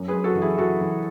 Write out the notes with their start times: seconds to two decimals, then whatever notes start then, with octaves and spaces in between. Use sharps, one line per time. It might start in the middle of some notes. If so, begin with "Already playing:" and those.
Already playing: F#2
0.08 G#4 B4
0.13 F#2
0.24 F#4 A4
0.36 E3
0.42 E4 G#4
0.58 E3 F#4 A4
0.81 E3